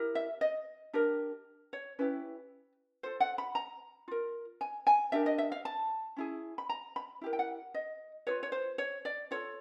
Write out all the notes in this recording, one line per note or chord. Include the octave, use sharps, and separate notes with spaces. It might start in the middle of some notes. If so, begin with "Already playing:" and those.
Already playing: E4 G4 A#4
E5
D#5
D4 G4 A#4
C#5
C#4 E4 G4 B4
F4 A4 C5
F#5
B5
A#5
F4 A#4
G#5
G#5
D4 G4 A#4 E5
D#5
E5
F5
A5
C#4 E4 G#4
B5
A#5
B5
E4 G4 A#4
G5
F#5
D#5
F4 G#4 B4 C#5
C#5
C5
C#5
D5
F4 A4 C#5